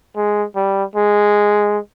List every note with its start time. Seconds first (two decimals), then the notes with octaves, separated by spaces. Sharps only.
0.16 G#3
0.56 G3
0.95 G#3